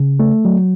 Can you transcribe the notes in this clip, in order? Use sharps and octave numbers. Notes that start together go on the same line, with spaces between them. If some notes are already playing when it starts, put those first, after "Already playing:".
Already playing: C#3
A3
F#3